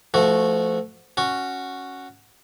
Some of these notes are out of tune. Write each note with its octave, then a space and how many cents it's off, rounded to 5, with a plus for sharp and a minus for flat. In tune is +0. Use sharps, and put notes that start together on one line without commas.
F3 -25 A3 +0 F#4 -10
C#4 +0 F#4 +0